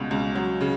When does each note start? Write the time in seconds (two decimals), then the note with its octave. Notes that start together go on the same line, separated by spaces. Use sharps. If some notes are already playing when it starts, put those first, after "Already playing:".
Already playing: C#2 B2 G3
0.11 C#2
0.35 F#3
0.60 C#3